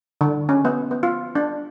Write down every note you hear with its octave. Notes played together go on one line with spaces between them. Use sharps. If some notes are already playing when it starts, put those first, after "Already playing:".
D3
C#4
B3
B3
F4
D4